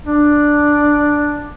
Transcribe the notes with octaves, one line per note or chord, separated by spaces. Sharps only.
D4